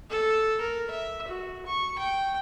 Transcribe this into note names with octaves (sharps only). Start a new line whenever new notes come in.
A4
A#4
E5
F#4
C#6
G5